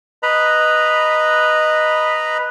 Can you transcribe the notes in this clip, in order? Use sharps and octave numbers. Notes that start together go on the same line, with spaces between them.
B4 D#5 A#5 B5